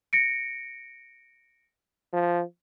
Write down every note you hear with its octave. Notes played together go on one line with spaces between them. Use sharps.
A#6 C#7 D7
F3